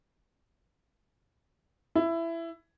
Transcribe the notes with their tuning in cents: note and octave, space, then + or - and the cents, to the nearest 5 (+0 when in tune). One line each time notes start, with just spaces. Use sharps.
E4 +15